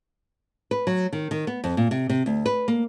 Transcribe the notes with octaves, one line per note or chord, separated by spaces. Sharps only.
B4
F#3
D#3
D#3
B3
F2
A#2
C3
C3
D2
B4
A#3